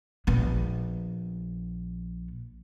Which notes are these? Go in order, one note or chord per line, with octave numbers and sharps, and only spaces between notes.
A#1 B3